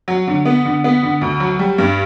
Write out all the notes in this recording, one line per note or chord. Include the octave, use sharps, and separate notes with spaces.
F#3
D3
B3
D3
B3
D3
D2
F#3
G3
G2